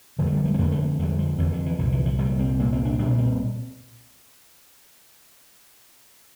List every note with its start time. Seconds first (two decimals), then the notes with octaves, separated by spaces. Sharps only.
0.19 F2 D3 F3
0.26 A3
0.32 G3
0.45 A3
0.54 C4
0.59 F2 D3 A#3
0.72 A3
0.99 F2 D3 G3
1.19 F3
1.38 F2 D3 E3
1.52 D3
1.66 E3
1.79 C2 A#2 D3
1.92 E3
2.06 F3
2.18 C2 A#2 G3
2.39 C4
2.59 C2 A#2 A#3
2.73 C4
2.85 D4
2.99 C2 A#2 D4
3.18 C4